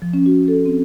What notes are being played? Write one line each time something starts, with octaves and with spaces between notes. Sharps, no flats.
F3
C#4
F#4
A4
C4